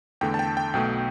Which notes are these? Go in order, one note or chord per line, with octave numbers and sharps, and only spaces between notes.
E2 D3 A3 G5
A5
G5
G5
B1 B2 A3 G5